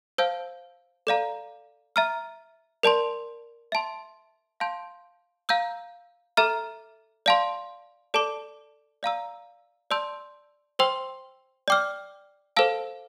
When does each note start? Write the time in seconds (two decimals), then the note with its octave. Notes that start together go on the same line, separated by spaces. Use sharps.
0.18 C5 F5 A5 E6 G6
1.07 A4 D5 F5 A#5
1.96 E5 A#5 F6
2.83 A#4 D5 A5 C6
3.72 E5 A5 C6
4.60 F5 A5 C6 G6
5.49 F5 A#5 E6 G6
6.37 A4 E5 A#5 F6
7.26 D5 F5 A5 C6
8.14 A4 D5 A5 D6
9.03 D5 F5 A#5 E6
9.91 D5 A5 C6 E6 G6
10.79 C5 G5 C6 E6
11.68 D5 G5 D6 F6
12.57 A4 C5 F5 A5 E6